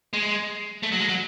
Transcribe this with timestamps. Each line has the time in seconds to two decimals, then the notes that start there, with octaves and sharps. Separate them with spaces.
0.13 G#3
0.83 A3
0.92 F#3
1.00 G#3
1.09 F#3